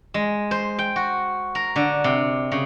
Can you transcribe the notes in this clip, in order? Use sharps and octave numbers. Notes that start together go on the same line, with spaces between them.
G#3
C5
G5
F#4
A#4
D3
C3
C#3